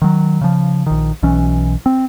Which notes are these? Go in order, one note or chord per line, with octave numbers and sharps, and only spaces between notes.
D#3 F#3
C#3 F3
A#1 D#3
B1 B2 E3 C#4
C4